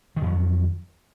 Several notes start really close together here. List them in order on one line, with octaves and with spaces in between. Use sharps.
D#3 F2 F#3